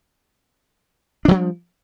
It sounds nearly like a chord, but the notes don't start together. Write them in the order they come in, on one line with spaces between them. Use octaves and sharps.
D4 D3 F3 G3